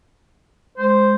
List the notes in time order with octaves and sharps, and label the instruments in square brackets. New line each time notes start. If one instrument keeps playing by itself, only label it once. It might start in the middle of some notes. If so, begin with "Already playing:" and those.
[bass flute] G#3 [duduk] C5